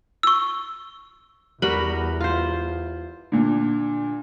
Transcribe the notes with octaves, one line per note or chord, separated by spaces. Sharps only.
C#6 E6
E2 G3 F#4 A#4 B4 B5
F4 C5
A#2 D3